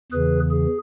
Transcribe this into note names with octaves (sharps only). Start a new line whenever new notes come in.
E2 C#3 E3 G#4 B4
G#4